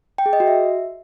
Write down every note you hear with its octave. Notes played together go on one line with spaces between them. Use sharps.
G5
G#4
D#5
F#4
E5